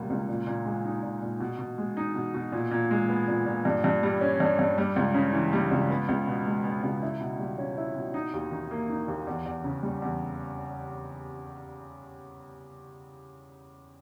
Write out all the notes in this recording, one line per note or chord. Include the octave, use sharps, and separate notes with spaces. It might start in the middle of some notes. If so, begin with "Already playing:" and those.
Already playing: C#2 B2 G3 A#3
C#2
A#2
A#2
G#3
D#4
A#2
A#2
B2
B2
G#3
D#4
B2
B2
A#2
A#2
G#3
B3
A#2
A#2
G2
G2
G3
C#4
G2
G2
G3
C#2
C#3
E3
G3
C#2
B3
C#2
B2
G#3
B3
C#2
E4
B2
G3
C#4
E4
B2
D#4
D#2
D#3
A#3
D#4
D#2
E2
E2
C#3
G3
E2